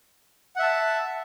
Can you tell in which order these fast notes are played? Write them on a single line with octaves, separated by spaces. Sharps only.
F#5 E5 A5